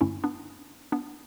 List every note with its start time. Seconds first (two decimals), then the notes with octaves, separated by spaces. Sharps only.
0.01 G2 D3 A3 C#4 E4
0.24 B3 D4
0.92 B3 D4